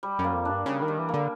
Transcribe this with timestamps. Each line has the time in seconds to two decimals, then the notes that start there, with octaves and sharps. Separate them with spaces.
0.03 G3
0.19 F#2
0.24 A#3
0.35 F2
0.45 G2 D4
0.66 C#3 G3
0.82 D#3
0.88 G3
0.99 E3
1.09 A#3
1.14 D3